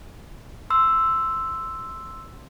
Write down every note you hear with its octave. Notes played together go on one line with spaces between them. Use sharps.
C6 E6